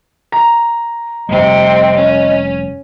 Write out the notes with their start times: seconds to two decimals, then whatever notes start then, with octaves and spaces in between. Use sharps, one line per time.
0.32 A#5
1.29 F1 C#2 C3 G3 C4 D#5
1.98 C#4